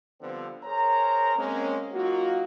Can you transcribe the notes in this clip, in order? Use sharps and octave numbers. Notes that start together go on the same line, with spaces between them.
D3 F3 G3 B3 C4
G#4 A#4 C5 C#5 A#5
G#3 A#3 C4 C#4
F#3 A#3 D#4 F4 F#4